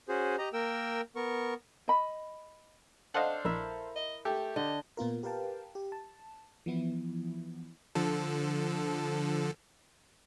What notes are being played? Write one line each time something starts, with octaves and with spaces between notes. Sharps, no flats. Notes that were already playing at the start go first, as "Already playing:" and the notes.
C#4 F#4 G#4 C5
G4 D#5 A#5
A#3 A#4 G5 E6
B3 A#4 C#6
D#5 B5
D4 A4 C5 D#5 F5 F#5
A#1 E4 A#4 E5
D#5
A3 G4 A4
D3 D#5
A#2 B3 F4 A#4
G4 A#4 B4 F5 G5 A5
G4
A5
E3 F3 B3 E4
D3 F3 A4